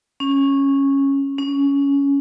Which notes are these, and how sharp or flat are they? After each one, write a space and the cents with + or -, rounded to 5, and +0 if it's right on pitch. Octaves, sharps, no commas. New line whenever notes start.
C#4 -10
C#4 +15